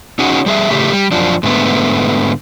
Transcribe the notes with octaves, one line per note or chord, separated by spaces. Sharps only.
C#4 D#4 F#4 G#4
G3 G#4 E5
A2 C#3 A3 G4
G3
F#2 F3 D4
G#2 D3 A3 B3